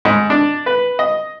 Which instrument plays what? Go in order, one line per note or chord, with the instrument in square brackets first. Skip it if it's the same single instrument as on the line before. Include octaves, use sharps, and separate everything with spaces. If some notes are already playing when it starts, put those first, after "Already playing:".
[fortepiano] G#2
D4
B4
D#5